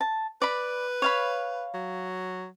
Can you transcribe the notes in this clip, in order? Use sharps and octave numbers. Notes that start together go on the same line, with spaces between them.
A5
B4 D5 B5
C#5 F5 B5
F#3